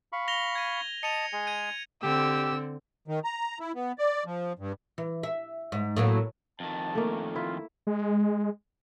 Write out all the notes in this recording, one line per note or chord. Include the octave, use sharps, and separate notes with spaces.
F5 B5 C#6
A#6 F7 G7
G#6 D#7
D#5 A5 C#7 D#7 F7
G#3 G#4 G#5
G#6 D#7
D3 C4 G4 E6
D#3
A#5
E4
B3
D5
F3
G2
E3
E5
G#2
A2 F#3 A#3
F2 D#3 A5
A3 A#3
E4 F4
G#3